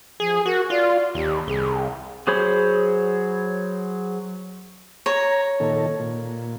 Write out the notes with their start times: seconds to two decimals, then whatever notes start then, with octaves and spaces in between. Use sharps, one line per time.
0.20 F3 G#4
0.46 F#4 A#4
0.70 F4 D5
1.15 D#2 G4
1.47 C2 G#4
2.27 F#3 G#4 C5 C#5 B5
5.06 C#5 A#5
5.60 A#2 D#3 A4
5.99 A#2